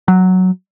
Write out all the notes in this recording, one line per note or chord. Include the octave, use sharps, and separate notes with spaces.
F#3